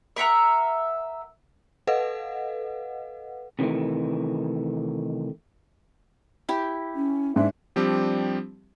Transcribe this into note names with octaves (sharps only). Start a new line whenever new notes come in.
A#4 E5 F#5 A#5
A4 B4 D#5 F5 F#5
C3 D#3 E3 A3
E4 G4
C#4
G#2 D4 E5
F3 G3 C4 D4 G4